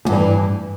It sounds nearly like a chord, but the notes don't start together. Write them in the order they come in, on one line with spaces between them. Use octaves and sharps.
E2 G2 E3